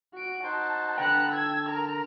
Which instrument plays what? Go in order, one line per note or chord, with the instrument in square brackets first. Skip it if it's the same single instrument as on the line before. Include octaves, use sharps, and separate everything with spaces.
[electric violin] F#4 D7
[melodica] D#4 F#4 C5 [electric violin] A5
[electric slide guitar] D3 G5 [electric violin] B4 F#6 [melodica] F#5 A5 A#5
[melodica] A5 [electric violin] E6 G#6
[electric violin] A#4 A#5